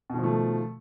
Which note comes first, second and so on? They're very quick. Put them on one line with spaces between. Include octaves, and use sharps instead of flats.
B2 D#3 F3 A3